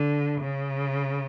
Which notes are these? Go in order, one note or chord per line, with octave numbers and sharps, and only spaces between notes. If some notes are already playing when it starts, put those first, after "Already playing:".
Already playing: D3
C#3